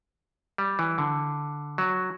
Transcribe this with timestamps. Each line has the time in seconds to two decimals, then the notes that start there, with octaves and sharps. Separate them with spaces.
0.58 G3
0.79 E3
0.98 D3
1.78 F#3